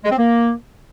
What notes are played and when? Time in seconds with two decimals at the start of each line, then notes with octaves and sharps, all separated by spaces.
0.05 G#3
0.11 C4
0.18 A#3